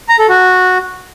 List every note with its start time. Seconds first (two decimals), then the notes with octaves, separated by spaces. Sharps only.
0.09 A#5
0.19 A4
0.29 F#4